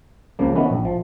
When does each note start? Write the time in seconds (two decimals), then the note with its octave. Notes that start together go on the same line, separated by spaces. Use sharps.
0.39 C#2 C#3 F3 A#3
0.56 D#3 E3 B3 C#4 B4
0.70 A#1
0.85 F3